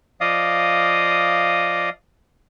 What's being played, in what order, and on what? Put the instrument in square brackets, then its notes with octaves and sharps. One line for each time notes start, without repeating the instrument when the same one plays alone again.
[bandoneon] F3 D5 D#5 F5 D#6